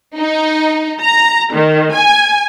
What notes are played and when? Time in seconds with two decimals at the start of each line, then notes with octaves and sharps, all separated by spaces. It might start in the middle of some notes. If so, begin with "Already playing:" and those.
0.15 D#4
1.03 A#5
1.53 D#3
1.93 G#5